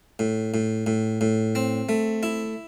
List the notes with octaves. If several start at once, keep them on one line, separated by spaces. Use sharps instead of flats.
A2
A2
A2
A2
C4
A3
E4